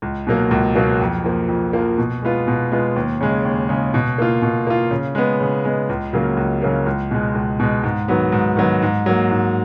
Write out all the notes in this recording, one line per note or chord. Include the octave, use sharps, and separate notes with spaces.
C#2
B2 F#3 A#3
C#2
B2 F#3 A#3
F2
F3 A#3
F2
F3 A#3
B2
G#3 B3 F4
B2
G#3 B3 F4
D#2
C#3 G#3
D#2
C#3 G#3
B2
A#3 F4
B2
A#3 F4
C#3
G#3 B3
C#3
G#3 B3
C#2
C#3 F#3 A#3
C#2
C#3 F#3 A#3
C#2
B2 G#3
C#2
B2 G#3
G#2
D#3 F#3 B3
G#2
D#3 F#3 B3
G#2
F#3 A#3
G#2